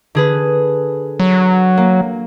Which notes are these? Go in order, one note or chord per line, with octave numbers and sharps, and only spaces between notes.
D3 G#4 B4
F#3
A#3